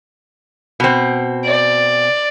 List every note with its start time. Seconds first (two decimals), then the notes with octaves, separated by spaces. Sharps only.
0.80 B2 C4
1.45 D5